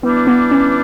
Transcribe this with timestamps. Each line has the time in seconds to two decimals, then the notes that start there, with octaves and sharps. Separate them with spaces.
0.03 E3 G3 B3 D4
0.27 B3
0.51 C#4